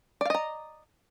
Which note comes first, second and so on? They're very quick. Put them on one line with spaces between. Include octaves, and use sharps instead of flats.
D5 F5 D#5 A#5